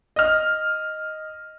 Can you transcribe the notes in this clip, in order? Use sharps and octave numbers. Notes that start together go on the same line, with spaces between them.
D#5 F6